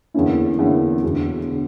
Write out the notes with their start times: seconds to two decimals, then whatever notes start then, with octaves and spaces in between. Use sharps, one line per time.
0.14 E2 D3 A#3 C#4 E4
0.59 E2 D3 A#3 C#4 E4
1.03 E1 E2 D3
1.50 D3